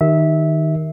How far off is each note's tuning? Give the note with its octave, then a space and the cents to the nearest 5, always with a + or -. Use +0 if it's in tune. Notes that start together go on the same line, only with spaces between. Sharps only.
D#3 +0 G4 -15 E5 -15